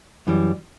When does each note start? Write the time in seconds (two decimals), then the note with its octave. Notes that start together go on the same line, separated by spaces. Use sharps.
0.27 F#2 E3 G3